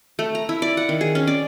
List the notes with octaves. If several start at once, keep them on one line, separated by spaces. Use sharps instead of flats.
A3
A#5
E4
D5
F#5
D#3
G#4
C#4
D5